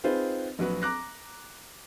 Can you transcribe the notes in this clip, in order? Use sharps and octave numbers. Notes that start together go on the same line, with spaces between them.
C4 D#4 F4 G#4 B4 C5
A#1 F#3 F#4 B4
A#5 D6 F#6 A#6